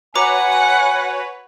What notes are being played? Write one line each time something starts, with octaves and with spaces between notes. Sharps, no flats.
F#4 B4 C#5 F#5 G#5 A#5 D6